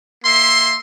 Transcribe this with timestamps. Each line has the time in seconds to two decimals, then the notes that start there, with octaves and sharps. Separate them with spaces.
0.25 A#3 E5 C6